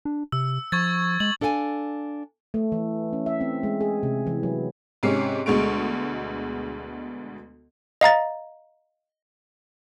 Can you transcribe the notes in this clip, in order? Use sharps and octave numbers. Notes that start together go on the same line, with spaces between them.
D4
C3 E6
F3 C#6 G#6 A6
G#3 F#7
D4 A4 F5 G5 G#5
A3
E3
C#4
E5
C4
G#3
G#4
C3
E3
F#3
G#2 C3 C#4 C7
D2 B2 G#3 C#6 D7
D#5 F5 A#5 A6